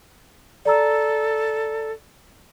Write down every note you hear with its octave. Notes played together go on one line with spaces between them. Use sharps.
A4 D5 A#5 E6